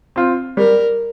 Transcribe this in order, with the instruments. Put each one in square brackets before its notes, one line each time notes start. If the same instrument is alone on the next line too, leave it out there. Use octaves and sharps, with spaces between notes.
[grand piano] C4 F4
[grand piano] G3 [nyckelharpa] A#4